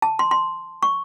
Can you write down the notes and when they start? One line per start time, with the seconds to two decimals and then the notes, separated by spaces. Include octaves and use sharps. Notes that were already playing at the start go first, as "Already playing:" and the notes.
0.02 A5
0.19 C6
0.31 C6
0.83 C#6